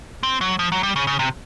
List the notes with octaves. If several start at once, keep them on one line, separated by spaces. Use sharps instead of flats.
C4
F#3
F3
F#3
G3
C#3
C#3
C3